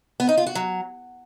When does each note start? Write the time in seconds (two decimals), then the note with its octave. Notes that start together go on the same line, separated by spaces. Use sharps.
0.20 B3
0.29 D#4
0.38 F4
0.46 F#4
0.55 F#3